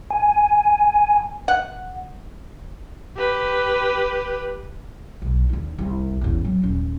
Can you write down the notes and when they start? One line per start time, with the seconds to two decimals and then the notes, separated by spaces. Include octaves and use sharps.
0.10 G#5
1.48 F#5
3.17 G4 B4
5.22 B1
5.49 D#2 D3
5.78 C2
6.21 A1 E2
6.45 F#3
6.62 D#1 C#4